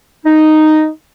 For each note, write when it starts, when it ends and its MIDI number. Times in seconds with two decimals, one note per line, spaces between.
0.25 0.88 63